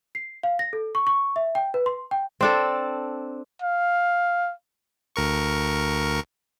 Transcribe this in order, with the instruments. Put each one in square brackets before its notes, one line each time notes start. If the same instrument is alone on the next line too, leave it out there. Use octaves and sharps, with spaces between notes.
[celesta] C7
F5
A#6
A4
C#6
C#6
E5
G5
B4
C6
G5
[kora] C4 D4 A4
[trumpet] F5
[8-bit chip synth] D2 A#4 C#6